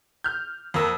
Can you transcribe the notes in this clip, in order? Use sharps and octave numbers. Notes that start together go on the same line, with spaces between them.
F6 G6
F2 A#3 E6